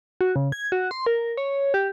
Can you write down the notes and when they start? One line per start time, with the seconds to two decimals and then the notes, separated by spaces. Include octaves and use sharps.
0.21 F#4
0.36 C#3
0.52 G#6
0.72 F#4
0.91 C6
1.06 A#4
1.37 C#5
1.74 G4